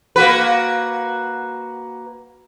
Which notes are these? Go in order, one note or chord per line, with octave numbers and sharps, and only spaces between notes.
A#3 F#4 B4